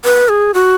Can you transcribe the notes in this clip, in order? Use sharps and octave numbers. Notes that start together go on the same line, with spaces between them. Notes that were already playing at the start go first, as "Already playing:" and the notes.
B4
G#4
F#4